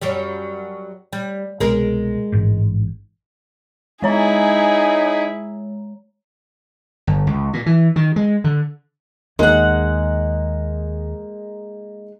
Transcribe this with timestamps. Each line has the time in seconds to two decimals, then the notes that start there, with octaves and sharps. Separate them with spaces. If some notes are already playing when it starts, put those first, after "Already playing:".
0.02 F#2 F#3 G3
1.13 G3
1.60 C2 B2 G#3 A#4
2.32 A1 G#2
4.02 G#3 D#4 E4 G#4 C#5 G#5 A#5
7.07 G1
7.27 C#2
7.53 A#2
7.66 E3
7.96 D#3
8.16 G#3
8.44 D3
9.39 D#2 G#3 A#3 D#4 F#5